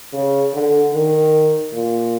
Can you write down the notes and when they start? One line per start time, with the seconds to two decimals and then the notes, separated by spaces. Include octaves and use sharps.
0.13 C#3
0.53 D3
0.93 D#3
1.73 A#2